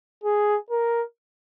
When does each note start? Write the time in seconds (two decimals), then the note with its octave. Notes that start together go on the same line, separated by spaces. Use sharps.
0.24 G#4
0.70 A#4